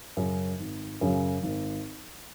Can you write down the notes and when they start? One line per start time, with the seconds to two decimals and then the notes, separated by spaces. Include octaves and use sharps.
0.17 F#2 C#3 F#3
0.60 G#1
1.01 F#2 C#3 F#3
1.43 G#1